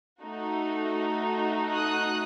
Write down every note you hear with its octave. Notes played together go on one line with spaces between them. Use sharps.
A3 D#4 F#4
D#6 F#6